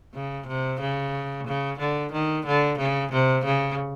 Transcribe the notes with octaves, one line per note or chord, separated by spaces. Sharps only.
C#3
C3
C#3
C#3
D3
D#3
D3
C#3
C3
C#3